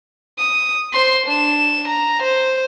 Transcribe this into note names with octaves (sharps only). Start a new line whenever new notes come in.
D#6
C5 C6
D4 E7
A#5
C5